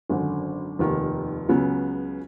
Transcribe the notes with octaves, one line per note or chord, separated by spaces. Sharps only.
G#1 F#2 D3
F1 D#2 D#3
C#2 C#3 F#3 B3